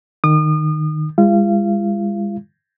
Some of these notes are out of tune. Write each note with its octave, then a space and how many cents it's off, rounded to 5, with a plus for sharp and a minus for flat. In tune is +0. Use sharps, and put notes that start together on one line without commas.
D#3 -20 D#6 -35
G#3 -40 F4 -40 F5 -30